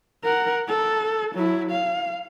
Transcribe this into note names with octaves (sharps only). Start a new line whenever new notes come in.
A#4 F#5
A4
F#3 E4
F5